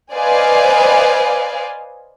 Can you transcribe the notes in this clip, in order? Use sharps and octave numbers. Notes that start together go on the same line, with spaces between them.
B4 C5 D5 D#5 F5 G#5